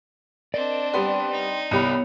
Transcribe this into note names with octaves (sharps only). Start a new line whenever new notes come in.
C4 D4 A#4 D5 D#5
G3 B3 B4 G5 C6
D#4
C2 B3 G4 C#5 B5